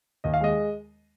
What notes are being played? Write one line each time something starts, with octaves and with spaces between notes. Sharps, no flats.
D#2 D#5
F5
G#3 D#5